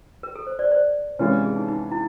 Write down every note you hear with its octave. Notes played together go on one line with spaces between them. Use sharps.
A#4
A4
C5
C5 D5
C5 D5
C3 E3 G#3 C#4 F4 B4 C#5
G#4
D#4
D#4
E4